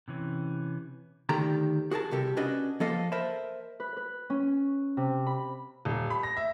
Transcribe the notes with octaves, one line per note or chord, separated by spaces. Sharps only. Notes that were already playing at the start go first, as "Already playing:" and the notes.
C3 E3 C#4
D2 D#3 G4 A4 A#5
F#4 G#4 A#4 A5
C2 C3 G4 A4
C#4 D4 F#4 B4 D#5
F3 A#3 A4 D#5 F5 F#5
A#4 C5 D#5 E5 A5 B5
B4
B4
C#4
C3
B5
D#1
B5
A#6
E5